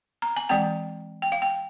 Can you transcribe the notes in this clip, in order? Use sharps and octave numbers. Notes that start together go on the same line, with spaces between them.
A#5
G#5
E3 G#3 C4 G5
G5
F5
G5